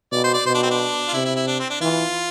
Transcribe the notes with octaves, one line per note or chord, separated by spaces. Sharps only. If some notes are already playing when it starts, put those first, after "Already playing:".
B2 D5
C5
D5
B2 C5
D4
C4
D4
F4
C3 E4
E4
E4
D4
C4
D4
E3 F4